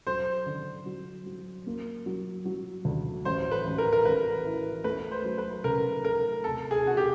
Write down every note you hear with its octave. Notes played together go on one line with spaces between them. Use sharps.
F#3 C5
D3
F#3
F#3
A#3
F#3
F#3
D2
A1 C5
B4
A1
A#4
A#4
A1 B4
E3
A3 B4
C5
F#3
B4
C#3 A#4
A3 A#4
C3 A4
G#4
C3 F#4
G4